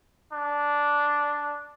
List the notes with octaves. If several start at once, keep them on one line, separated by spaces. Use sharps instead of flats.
D4